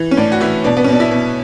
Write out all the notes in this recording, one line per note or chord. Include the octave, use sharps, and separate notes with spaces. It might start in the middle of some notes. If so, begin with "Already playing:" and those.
Already playing: E3
C#4
A2 D4
F#4
E3 E4
B2 D4
B3
C#4
B2 D4
E4
B2